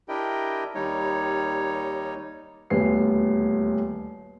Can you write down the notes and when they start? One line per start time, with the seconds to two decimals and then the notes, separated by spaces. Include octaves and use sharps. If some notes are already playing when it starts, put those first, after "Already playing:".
0.08 D4 E4 G4 A#4 D#5 G5
0.75 D#2 G3 D#4 C#5
2.70 D#1 D2 B3 C7